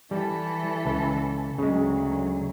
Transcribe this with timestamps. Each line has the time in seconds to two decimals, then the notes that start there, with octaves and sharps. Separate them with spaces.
0.11 E3 G3 A4
0.85 C#2
1.58 D2 C#3 F#3 G#3